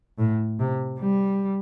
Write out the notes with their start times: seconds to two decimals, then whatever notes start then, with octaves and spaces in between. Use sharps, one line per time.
0.19 A2
0.59 C3
1.00 G3